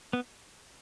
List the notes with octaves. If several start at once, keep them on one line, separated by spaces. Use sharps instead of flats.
B3